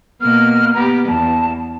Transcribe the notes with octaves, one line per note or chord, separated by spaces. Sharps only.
B2 A#3 F6
B3 G4 A#5
E2 A5